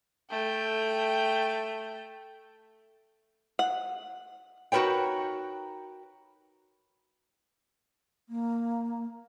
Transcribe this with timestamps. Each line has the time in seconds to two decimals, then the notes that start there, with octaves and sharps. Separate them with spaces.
0.30 A3 G5
3.59 F#5
4.72 D#4 F#4 A#4 B4 C#5 G5
8.29 A#3